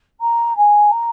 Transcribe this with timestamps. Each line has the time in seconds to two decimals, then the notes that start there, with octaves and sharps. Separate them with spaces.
0.20 A#5
0.56 G#5
0.91 A#5